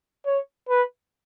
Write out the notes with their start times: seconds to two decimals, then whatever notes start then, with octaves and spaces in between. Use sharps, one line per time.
0.26 C#5
0.69 B4